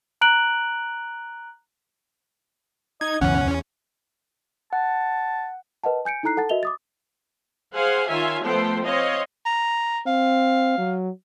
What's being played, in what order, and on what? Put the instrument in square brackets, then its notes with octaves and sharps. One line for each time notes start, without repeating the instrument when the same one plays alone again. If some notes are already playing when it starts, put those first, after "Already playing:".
[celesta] A#5 F#6 D7 F#7
[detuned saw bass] D#4 [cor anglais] D#5 [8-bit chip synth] G#6
[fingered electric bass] C#2 F#2 B2 [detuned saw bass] E3 [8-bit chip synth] C#4 [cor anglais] F#5
[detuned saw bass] E2
[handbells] F#5 [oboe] A5
[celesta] A#4 B4 D#5 F#5 A5
G#5 G6 C#7 D7
D#4 E4 A4 A#5 F#6 C7
A4 F#5 A5 A6
F#4 A#4 D#5 E5 F7 G7
D6 D#6 A6
[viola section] G#4 C5 F5 F#5 G#5
D#3 F4 C#5 E5 G#5
F3 A3 B3 A4 C5 G5
C4 C5 C#5 D#5 F5
[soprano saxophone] A#5
[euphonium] C4 [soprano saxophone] F5
[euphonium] F#3